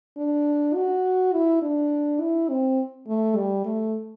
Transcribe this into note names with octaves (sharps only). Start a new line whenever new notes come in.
D4
F#4
E4
D4
E4
C4
A3
G3
A3